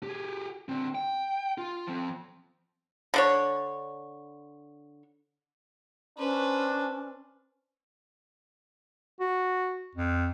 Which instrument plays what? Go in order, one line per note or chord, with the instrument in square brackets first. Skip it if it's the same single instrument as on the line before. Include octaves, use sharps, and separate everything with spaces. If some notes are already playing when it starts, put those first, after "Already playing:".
[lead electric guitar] G4 G#4
D3 C4
G5
F4
F3 C4
[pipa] D3 D4 C#5
[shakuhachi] C#4 [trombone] D4 [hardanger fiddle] B4 C5
[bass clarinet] F#4
F2